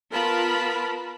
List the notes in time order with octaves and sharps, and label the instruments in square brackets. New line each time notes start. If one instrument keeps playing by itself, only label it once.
[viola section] B3 F4 A#4 A5 B5